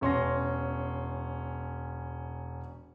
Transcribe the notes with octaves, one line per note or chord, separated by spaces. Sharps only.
E1 C#4 C6 A#6